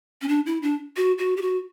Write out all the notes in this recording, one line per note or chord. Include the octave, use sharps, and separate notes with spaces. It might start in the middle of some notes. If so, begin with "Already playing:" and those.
C#4
D4
E4
D4
F#4
F#4
G4
F#4